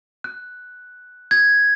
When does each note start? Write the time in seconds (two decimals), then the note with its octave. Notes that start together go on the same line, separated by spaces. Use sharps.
0.24 F#6
1.31 G#6